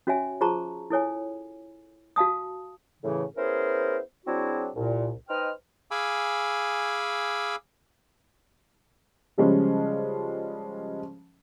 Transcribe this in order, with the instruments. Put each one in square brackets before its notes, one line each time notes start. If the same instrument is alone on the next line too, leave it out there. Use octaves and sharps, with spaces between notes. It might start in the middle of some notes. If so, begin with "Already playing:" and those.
[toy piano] C#4 F#4 C#5 E5 G#5
F4 G#4 C5 A5 A#5 C#6
E4 A4 C#5 G#5
F#4 F5 A5 D#6
[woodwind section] A2 C#3 E3
B3 C#4 E4 G#4 A#4 C5
F#3 C4 D4 E4 F#4 G#4
C2 A#2
D#4 B4 C5 D#5 G5 F6
[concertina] G#4 F5 G#5 B5 D6 E6
[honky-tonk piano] C#3 F3 G3 G#3 C#4